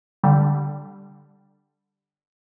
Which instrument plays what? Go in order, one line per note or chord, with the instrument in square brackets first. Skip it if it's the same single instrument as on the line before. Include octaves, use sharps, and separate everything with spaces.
[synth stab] D3 G3